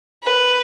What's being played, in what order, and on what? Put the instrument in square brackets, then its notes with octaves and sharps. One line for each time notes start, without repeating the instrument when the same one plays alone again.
[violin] B4